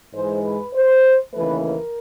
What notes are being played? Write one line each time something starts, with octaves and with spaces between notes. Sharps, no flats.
G#2 E3 G#3 C5
B4
C5
D#2 C#3 E3 A3 B4
A#4